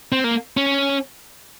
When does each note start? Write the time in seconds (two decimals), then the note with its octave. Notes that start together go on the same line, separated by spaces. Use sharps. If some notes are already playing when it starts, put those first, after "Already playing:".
0.12 C4
0.24 A#3
0.57 C#4